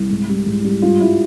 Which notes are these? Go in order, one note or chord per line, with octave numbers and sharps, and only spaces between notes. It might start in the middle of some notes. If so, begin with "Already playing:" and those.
Already playing: C2
G#2
G3
G#2
G3
G2 F4
G3 E4